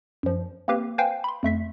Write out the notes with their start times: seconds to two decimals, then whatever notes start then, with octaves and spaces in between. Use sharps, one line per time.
0.23 F#2 F3
0.68 A#3 C4 G4 B4 F5
0.98 B4 C5 F5 G5 G#5
1.24 B5 C6
1.43 F2 A3 E5 B6